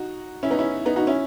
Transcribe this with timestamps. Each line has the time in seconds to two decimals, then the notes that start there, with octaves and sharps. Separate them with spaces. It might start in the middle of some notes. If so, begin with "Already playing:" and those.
Already playing: D#4 F#4
0.43 C#4 E4
0.51 B3 D#4
0.59 C#4 E4
0.86 B3 D#4
0.96 D#4 F#4
1.07 C#4 E4